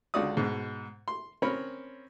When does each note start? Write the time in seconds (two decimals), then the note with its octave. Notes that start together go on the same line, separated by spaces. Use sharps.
0.14 C#2 D3 F4 F#4 D5 D#6
0.37 G#2 B2
1.08 C6
1.42 C4 C#4 A#4 C#5 B5